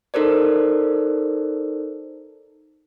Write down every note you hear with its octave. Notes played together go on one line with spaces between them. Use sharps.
D#4 A4 A#4 C5 D5